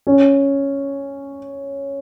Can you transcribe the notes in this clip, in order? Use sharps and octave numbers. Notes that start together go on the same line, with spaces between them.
C#4